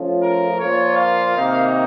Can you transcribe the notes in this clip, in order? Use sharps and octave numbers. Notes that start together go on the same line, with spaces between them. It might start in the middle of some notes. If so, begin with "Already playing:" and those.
Already playing: F3 A3 C#4 F4
A#4
A#2 F3 A#3 F4 C#5
F5
C3 D#3 A#3 D#4